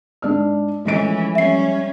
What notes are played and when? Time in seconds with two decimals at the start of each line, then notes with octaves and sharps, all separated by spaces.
0.22 G#2 D4 F6
0.85 E3 F3 G#3 A3 C#4 D#5 D7
1.35 G3 C#4 E5 C7